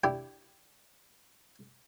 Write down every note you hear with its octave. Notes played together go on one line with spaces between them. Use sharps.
D4 E4 G4